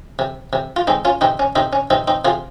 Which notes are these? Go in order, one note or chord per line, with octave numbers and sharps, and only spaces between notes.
C3
C3
F4
G#3 C4 D#4
C#4 F4
C3 C4 D#4
C#4
C3 C4 D#4
C#4
C3 C4 D#4
C4 D#4
C3 F4 G#4